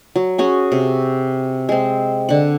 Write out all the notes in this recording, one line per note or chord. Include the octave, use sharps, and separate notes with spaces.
F#3
C#4 F#4 G#4
C3
G#3 C4
D3 F#5